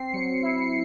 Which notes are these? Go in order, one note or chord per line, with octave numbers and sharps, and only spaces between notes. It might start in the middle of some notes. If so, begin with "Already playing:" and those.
Already playing: C4 C7
F#3 C#7
E4